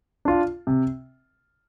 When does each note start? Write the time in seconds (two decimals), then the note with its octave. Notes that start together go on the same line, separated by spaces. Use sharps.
0.25 D4 F4
0.67 C3